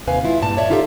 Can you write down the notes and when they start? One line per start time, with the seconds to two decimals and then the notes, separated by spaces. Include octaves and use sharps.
0.07 D#2 C3 B4 F5 G#5
0.24 G#3 E4 F4
0.42 G2 A#2 A5
0.57 C#5 D5 E5
0.70 D#4 F4 G4 A4 C#5 E5